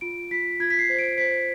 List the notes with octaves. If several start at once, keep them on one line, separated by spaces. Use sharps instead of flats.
F4 D7
F4 B6
F4 G#6
B6
C7
C5
D7
C5 B6